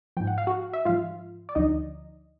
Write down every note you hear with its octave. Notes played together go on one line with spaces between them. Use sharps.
G#2 F3 G5
F#5
F5
F#4 F#5
E5
G#2 F3 F4 F5
D5
D2 D3 F3 D#4 D#5